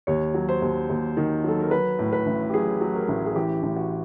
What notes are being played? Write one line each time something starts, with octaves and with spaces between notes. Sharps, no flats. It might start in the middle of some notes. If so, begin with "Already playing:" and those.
D#2 C#5
F#3
C5
D#2
D#2
D#3
F#3 A4
A#4
F#3 B4
A2
B4
A1
G4
F#3 G#4
F#3
A#4
A1
G#4
E3 G4
A1
F#4